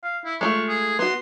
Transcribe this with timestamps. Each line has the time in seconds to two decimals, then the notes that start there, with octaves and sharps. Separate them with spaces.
0.04 F5
0.25 E4
0.41 G#3 A3 F4 C#6
0.68 G#4
0.99 B3 F#4 C6